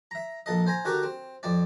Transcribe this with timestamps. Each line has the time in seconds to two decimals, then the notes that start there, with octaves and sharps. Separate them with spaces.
0.11 E5 A#5
0.46 A#1 A4 D#5
0.67 C5 G#5 A#5
0.85 D3 F#4 G4 A#4
1.03 C4
1.43 F2 C4 D5